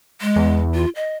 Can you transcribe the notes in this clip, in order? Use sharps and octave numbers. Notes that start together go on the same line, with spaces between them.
G#3
E2
F4
D#5